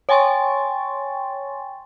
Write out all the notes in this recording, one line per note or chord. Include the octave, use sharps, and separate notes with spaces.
C#5 G5 G#5 C6 C#6 A6